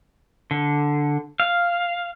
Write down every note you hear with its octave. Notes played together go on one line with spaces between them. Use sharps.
D3
F5